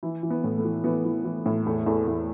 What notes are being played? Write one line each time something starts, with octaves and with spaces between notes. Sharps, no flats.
E3 E4
E3
B3
A2
A3
E3
E3 B3
E3
E3
A2
E2 A3
E2 A3
E2